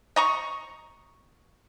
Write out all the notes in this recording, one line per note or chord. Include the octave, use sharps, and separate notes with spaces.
D#5 A#5 C#6